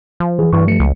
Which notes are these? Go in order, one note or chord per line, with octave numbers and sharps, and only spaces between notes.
F3
E3 G#4
G2 E3 C#6
F3 A3 C#7
C#2